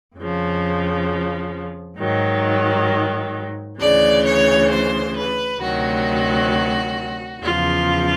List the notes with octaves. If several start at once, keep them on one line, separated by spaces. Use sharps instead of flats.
F2 C#3 F3
G#2 D#3 F#3
D2 C#3 E3 D5
C#5
C5
B4
D2 C3 D#3 F#3 F#4
E2 C#3 F3 F4